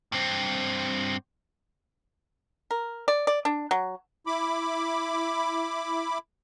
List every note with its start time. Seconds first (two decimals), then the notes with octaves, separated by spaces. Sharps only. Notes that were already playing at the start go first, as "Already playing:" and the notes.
0.12 G2 C4
2.71 A#4
3.08 D5
3.27 D5
3.45 D4
3.71 F#3
4.27 E4 B5 D6